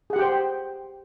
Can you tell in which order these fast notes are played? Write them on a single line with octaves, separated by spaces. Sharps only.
G#4 F#5 G4 G5 C5